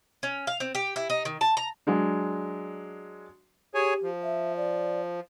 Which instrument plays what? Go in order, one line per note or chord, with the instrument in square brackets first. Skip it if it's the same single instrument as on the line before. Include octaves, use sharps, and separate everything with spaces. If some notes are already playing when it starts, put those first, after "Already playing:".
[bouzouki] C#4
F5
C4
G4
E4
D#4
D#3
A5
A#5
[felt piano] F#3 G#3 D4
[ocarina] G4 [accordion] G#4 C#5 G#5
[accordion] F3
[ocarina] E5
D5